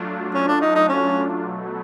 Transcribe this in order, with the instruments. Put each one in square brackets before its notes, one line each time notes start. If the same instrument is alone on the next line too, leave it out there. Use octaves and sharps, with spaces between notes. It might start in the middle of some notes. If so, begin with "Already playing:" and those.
Already playing: [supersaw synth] F#3 A3 D4 F4
[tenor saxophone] C#4
D4
D#4
D#4
C#4
[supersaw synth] B2 F#3 A3